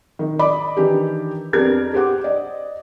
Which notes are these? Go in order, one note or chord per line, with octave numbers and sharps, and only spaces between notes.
D#3
D5 D#5 B5 D6
D#3 E3 D4 D#4 G4
F2 B3 D4 G4 A#4 G#6
G4 C5 F#5 D6
D5 D#5